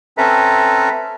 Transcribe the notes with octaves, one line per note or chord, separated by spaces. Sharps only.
C4 C#4 A4 B4 E5 A#5